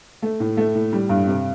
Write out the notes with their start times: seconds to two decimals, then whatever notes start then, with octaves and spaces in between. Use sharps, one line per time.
0.22 A3
0.40 A2
0.57 A3
0.75 A2
0.93 G3
1.09 G2
1.27 C3